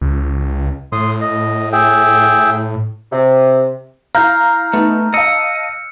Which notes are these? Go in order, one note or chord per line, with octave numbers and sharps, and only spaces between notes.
C#2
A2 C6 D#6
D#5
G#4 E5 G5
C3
E4 F5 A#5 F6 G6
A3 B3 D#4
D#5 F5 A5 E6 C#7